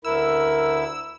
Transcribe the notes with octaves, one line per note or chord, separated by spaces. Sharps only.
D2 E4 A#4 E6